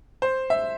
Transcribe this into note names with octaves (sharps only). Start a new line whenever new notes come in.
C5
E5